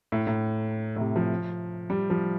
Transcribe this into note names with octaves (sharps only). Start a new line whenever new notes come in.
A2
A2
A2
C3
F3
G3
F3